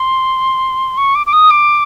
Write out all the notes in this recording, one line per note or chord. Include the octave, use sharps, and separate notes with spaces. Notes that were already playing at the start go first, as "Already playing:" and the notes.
Already playing: C6
C#6
D6
D6
D#6
D6